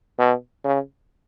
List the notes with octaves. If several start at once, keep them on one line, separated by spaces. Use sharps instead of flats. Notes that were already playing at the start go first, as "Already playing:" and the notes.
B2
C#3